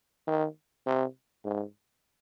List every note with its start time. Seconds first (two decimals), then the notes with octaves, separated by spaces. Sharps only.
0.27 D#3
0.86 C3
1.45 G#2